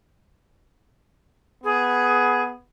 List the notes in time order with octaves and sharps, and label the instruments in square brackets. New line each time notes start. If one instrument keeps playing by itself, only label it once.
[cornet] B3 [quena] G#4